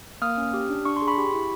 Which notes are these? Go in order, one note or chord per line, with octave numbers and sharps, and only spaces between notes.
A#3 D#6 F6
C#4
G4
D4
D4 C#6
C6
G#4
B5 C#6
G4
E4